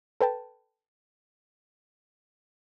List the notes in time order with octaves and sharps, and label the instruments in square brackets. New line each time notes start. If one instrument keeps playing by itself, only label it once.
[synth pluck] A4 B4 G5 A5